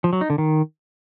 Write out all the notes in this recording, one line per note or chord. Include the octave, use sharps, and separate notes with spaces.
F3
F#3
D#4
D3
D#3